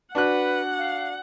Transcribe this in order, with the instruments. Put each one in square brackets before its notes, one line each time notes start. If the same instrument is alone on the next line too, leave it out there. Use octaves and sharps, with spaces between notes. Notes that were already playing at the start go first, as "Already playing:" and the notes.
[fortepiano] D4 F#4 F#6 [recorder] B4 [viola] F#5
[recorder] F5